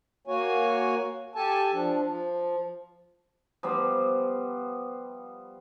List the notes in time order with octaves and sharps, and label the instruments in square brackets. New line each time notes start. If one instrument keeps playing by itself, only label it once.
[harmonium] A#3 F#4 C#5 G#5
G4 A4 G#5 A5
F3 D4
F3
[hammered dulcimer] F3 G3 B3